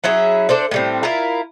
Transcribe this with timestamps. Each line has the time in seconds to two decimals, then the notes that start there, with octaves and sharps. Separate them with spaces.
0.04 F#3 C#4 E4 G#4
0.49 D4 A4 C5 D5
0.71 A2 G3 C4
1.03 E4 F4 A#4